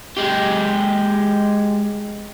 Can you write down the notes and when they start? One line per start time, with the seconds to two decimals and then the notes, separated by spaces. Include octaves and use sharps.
0.17 G#3 G4